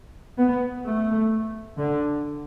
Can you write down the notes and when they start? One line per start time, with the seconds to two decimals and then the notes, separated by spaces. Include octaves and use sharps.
0.38 B3
0.85 A3
1.79 D3